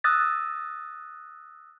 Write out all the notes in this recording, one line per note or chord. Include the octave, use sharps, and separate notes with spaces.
D#6 E6 F#6 A6 A#6